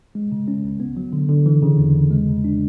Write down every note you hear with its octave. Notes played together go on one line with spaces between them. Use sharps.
G#3
C#3
C#4
C#2
B3
F#3
D3
D3
E3
C#3
E2
E2
G#3
C#3
D4